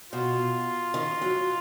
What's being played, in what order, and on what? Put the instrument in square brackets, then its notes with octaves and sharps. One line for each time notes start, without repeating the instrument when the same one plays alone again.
[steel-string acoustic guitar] B2 [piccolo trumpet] F4
[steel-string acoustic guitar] D#3
F#3